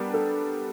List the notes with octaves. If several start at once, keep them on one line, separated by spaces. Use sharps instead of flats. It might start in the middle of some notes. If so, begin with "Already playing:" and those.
Already playing: G3 B3 D4 G4 A#4
A4